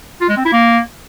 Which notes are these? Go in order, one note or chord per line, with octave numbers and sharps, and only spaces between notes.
F4
G#3
C4
E4
A#3